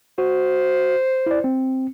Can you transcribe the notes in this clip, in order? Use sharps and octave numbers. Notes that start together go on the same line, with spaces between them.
F#4 C5
E4 D5
C4